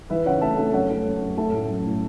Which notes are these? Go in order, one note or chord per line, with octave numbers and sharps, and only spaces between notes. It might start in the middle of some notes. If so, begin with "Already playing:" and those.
E3 B4 E5
C#3 C#5 F#5
A3 E5 A5
A3
F#2 C#5 F#5
A3
F#2
F#2
A3 E5 A5
A2
F#3
A2